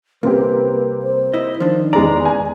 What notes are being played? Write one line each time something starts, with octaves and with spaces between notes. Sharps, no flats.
C2 A#3 C4 G4 B4
C5
E4 D#5
D#3 F3 D4
E2 G#3 D5 A#5
G#5